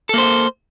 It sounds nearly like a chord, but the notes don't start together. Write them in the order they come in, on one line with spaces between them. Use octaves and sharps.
A4 A#3 C5